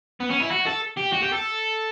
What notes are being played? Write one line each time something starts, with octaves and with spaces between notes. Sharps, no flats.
B3
C#4
E4
F#4
A4
G4
F#4
G4
A4